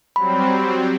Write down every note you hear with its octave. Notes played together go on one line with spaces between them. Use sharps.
F#3 G3 C4 B5